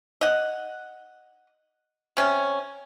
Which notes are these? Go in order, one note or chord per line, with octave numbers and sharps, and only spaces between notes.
D#5 F#5
C3 C#4